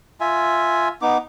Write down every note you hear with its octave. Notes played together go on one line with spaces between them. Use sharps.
F4 E5 G#5
B3 D#4 D6